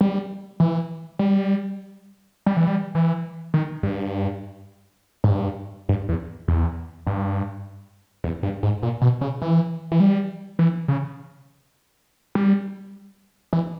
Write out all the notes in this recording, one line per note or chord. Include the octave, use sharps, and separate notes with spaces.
G3
E3
G3
G3
E3
G3
E3
D#3
G2
G#2
G2
G2
E2
E2
G2
E2
G2
G#2
A#2
B2
C#3
E3
E3
G3
E3
C#3
G3
E3